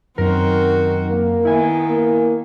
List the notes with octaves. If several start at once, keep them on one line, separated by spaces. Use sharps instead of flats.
F#2 D#3 C4 F#4 A#4
A#3
D#3 B3 E4 G#5
A#3